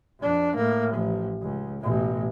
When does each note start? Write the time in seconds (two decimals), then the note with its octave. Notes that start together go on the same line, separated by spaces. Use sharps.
0.20 F2 D4
0.55 A2 A#3
0.94 A1 F3
1.42 C#2
1.80 A1 B2